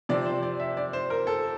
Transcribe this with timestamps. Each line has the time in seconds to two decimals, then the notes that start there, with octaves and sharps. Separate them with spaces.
0.09 C3 F3 C4 D5
0.26 C5
0.43 D5
0.60 E5
0.77 D5
0.93 C5
1.10 A#4
1.27 A4